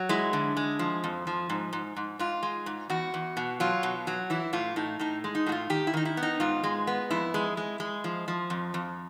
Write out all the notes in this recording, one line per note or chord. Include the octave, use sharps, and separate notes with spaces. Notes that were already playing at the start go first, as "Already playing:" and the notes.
Already playing: F#3
G#3 E4
D3
G#3
F3
F2
F3
G#2
G#2
G#2
G#2 F4
G#3
G#2
E2 F#4
E2
B2
F#3 F4
B2
F#3
E3 E4
A2 F4
A2 D#4
A2 D#4
G#3
D#4
A2 F#4
F4
D#3 G4
E4
D#3 D#4
E4
B3
D#4
G#2 F4
G#3
B3
F2 E4
G#3
G#3
G#3
F3
F3
F2
F2